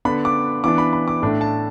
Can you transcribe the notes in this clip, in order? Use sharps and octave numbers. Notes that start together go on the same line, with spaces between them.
D3 B3 D4 B5
D6
E3 B3 D4 D6
B5
B5
D6
A2 A3 D4
A5